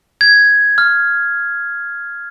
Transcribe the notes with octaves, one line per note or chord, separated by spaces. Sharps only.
G#6
F6